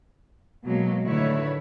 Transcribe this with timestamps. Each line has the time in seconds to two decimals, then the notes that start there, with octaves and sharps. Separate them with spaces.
0.65 B2 F#3 G#3 A#3
1.03 A2 D3 D#3 E4 B4 C#5